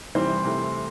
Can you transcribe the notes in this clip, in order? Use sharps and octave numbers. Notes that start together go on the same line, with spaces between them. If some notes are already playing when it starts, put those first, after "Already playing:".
C3 E3 G3 C4 C5
C3 E3 A3